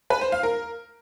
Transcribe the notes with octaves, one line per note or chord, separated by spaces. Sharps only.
B4
C5
F5
A#4